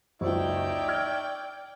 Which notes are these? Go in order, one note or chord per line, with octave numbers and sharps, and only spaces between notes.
F#1 C#2 D#4 C#5 D5 E5 G5
F6 G#6